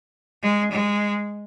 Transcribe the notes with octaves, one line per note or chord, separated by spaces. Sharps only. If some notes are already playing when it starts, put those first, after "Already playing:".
G#3
G#3